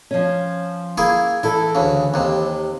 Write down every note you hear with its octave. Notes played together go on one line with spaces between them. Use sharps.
F3 C#4
A#3 E4 G#4
E3 E4 A4
D2 C#3
D#2 C3